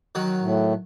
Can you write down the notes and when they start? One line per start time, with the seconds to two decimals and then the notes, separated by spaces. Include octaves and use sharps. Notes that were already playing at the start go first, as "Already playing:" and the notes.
0.15 D#3 F#3
0.40 A2